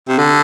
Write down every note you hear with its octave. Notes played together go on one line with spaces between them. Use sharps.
C3
D3